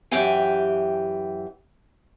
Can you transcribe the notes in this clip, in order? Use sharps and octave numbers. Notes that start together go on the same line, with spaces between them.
F#2 E3 G4 E5 G5 G#5